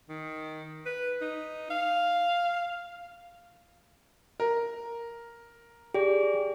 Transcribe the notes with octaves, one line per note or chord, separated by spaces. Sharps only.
D#3
B4
D#4
F5
A#4
G4 G#4 D5